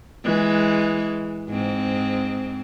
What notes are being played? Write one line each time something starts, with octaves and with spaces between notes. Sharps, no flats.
E3 G#3
G#2 C4